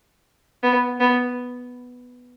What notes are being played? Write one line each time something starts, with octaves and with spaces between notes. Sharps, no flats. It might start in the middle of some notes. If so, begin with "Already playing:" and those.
B3
B3